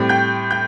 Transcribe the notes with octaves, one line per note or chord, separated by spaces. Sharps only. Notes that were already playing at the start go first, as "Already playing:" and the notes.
Already playing: A2 G3 C4
G5 G6
G5 G6